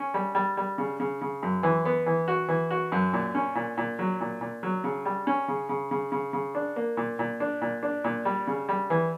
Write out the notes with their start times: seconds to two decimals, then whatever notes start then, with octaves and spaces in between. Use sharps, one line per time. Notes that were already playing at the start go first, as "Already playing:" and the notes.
Already playing: C#4
0.14 G3
0.35 G3
0.57 G3
0.78 C#3
1.00 C#3
1.21 C#3
1.43 F#2
1.63 E3
1.85 B3
2.06 E3
2.28 F#4
2.48 E3
2.71 F#4
2.92 F#2
3.13 A#2
3.35 C#4
3.55 A#2
3.77 A#2
3.99 F#3
4.21 A#2
4.41 A#2
4.63 F#3
4.84 C#3
5.05 G3
5.27 C#4
5.48 C#3
5.69 C#3
5.91 C#3
6.12 C#3
6.33 C#3
6.55 D4
6.76 A#3
6.97 A#2
7.19 A#2
7.40 D4
7.61 A#2
7.83 D4
8.04 A#2
8.25 G3
8.47 C#3
8.69 G3
8.90 E3